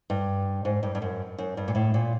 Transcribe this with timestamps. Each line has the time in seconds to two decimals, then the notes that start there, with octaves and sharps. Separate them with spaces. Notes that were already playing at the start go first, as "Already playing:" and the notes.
0.10 G2
0.65 G#2
0.83 G2
0.95 G2
1.02 F#2
1.38 F#2
1.57 G2
1.68 A#2
1.75 A2
1.94 A#2